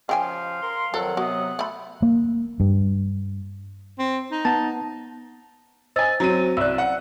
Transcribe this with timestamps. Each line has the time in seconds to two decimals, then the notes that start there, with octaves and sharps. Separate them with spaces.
0.09 C#3 F3 G4 F5 G#5
0.63 A#4 C6
0.94 F2 D#3 F#3 A4 F#5
1.17 C3 F#3 B3 F#4 D#5
1.59 A3 A4 B5
2.02 A#3
2.60 G2
3.99 C4
4.31 D#4
4.45 B3 F#5 A5
5.96 C5 D#5 G#5 E6 A6
6.20 F#3 C4 D#7
6.57 C2 D5 E6 F#6
6.78 F#5